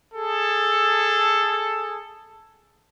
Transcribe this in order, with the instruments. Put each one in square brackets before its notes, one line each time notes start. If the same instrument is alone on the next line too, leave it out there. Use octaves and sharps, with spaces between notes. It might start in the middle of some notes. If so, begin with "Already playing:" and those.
[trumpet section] G#4 A4